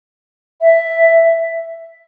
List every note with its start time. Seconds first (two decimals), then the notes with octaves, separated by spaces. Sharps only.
0.61 E5